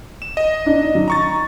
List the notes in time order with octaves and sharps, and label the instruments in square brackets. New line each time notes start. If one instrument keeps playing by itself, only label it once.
[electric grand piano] E7
D#5
[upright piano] D4 D#4
F#3
[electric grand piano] A#5 C#6 A6